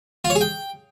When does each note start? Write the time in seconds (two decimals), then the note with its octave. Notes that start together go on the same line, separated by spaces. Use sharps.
0.25 F4
0.30 C#5
0.35 G#4
0.41 G5